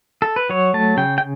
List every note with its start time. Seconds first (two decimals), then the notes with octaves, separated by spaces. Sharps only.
0.22 A4
0.36 B4
0.50 F#3 C#5
0.74 A3 A5
0.97 C#3 G5
1.18 G5